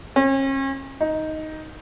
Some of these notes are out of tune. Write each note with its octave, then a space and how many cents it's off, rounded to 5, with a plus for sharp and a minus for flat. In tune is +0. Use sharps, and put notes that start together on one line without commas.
C#4 -40
D#4 +5